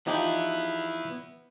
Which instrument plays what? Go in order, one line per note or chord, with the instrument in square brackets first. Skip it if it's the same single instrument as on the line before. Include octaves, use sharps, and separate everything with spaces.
[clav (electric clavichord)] F3 D#4 G4 [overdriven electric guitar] B3 E4